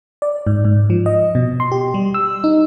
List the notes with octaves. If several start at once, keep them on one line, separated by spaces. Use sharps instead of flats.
D5
G#2
G#2
F3
D#5
B2
C6
G4
G3
E6
D#4